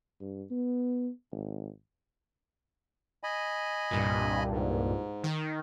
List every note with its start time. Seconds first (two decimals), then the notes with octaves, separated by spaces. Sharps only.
0.20 G2
0.51 B3
1.32 G#1
3.23 D#5 G#5 B5
3.91 C2 G2 A#2
4.51 G#2
5.24 D#3